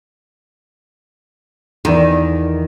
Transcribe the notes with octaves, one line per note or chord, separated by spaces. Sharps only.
E2 D#3